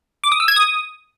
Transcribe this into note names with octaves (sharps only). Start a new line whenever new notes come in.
D6
D#6
E6
G#6
D#6